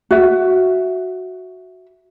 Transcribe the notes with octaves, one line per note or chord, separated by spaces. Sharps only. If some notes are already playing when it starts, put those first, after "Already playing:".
F#4 E5